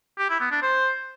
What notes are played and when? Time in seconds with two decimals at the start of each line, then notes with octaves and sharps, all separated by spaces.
0.19 G4
0.30 E4
0.41 B3
0.51 D4
0.62 C5